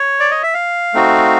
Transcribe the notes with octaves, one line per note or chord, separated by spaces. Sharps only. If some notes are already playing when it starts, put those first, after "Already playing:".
Already playing: C#5
D5
D#5
E5
F5
A3 C4 D#4 F#4